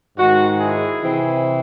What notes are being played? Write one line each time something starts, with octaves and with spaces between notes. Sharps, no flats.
G#2 D#3 G#3 F#4
E4 G#4
C3 E3 C4 E4